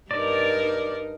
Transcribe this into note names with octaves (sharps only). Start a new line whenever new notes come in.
G2 D#4 A#4 D5